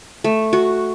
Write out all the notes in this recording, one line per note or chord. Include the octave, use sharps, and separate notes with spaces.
A3
F#4